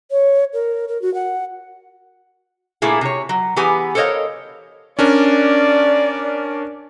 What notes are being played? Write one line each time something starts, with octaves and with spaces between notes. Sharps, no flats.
C#5
A#4
A#4
F#4
F#5
A#2 A3 A#3 E4 G#4
C3 C#5
F#3
E3 B3 G4 G#4 G#5
A4 A#4 C5 C#5 D#5 F5
C#4 D4 A#4 D5